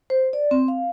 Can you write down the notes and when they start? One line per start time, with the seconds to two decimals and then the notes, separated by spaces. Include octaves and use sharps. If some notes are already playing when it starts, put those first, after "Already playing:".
0.10 C5
0.33 D5
0.51 C4
0.68 F5